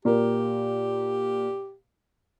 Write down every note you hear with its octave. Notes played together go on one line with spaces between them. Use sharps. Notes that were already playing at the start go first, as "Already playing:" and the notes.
A#2 G4 A#4